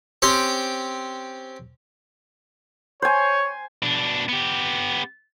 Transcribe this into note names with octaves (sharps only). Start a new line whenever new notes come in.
C4 C#4 G4 C5
C5 C#5 G#5
B2 D4
B3 G4